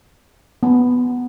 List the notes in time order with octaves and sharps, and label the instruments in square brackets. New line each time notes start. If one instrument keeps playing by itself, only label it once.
[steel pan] B3